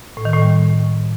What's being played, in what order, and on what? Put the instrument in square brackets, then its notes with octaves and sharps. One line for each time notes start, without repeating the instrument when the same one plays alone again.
[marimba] A2
D#3
A2
G3